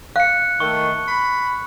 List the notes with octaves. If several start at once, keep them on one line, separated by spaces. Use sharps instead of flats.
F5 F#6 C#7
D#3 A3 C#6
B5